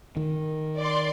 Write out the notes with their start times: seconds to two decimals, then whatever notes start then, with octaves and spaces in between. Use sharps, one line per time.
0.17 D#3
0.77 D5 C6